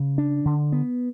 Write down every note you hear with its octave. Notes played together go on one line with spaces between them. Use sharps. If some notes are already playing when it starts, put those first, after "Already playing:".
Already playing: C#3
D4
D3
B3